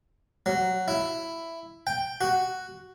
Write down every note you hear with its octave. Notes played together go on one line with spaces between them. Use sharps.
F#3
E4
G5
F#4